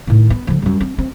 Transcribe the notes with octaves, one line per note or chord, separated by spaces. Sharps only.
A2 D#3
B3
D3 F3
F#2 G3
C4
C4